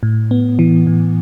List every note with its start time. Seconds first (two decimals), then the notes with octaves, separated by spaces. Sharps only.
0.03 A2
0.31 B3
0.59 E3
0.87 A2